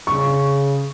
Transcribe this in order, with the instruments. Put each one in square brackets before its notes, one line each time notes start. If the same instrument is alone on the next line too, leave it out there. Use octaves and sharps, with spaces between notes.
[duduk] C#3 [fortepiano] C#6